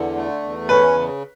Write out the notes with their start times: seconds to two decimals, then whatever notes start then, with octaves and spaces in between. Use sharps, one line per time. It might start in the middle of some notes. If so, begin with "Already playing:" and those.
Already playing: E2 D3
0.16 A3
0.43 E2
0.69 C#4 B4
0.96 C#3